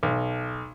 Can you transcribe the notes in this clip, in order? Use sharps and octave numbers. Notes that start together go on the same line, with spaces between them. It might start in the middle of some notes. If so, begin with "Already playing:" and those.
B1